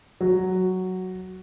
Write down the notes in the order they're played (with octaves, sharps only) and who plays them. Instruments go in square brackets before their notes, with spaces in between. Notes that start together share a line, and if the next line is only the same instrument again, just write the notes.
[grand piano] F#3